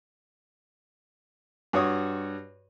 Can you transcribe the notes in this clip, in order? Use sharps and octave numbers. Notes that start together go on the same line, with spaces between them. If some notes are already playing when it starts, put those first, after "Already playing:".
G2 F#4 C#5 D#6